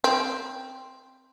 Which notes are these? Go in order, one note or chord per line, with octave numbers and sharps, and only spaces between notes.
C4